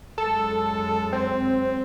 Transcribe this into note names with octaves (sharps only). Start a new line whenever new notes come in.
F#2 G#3 A4
C4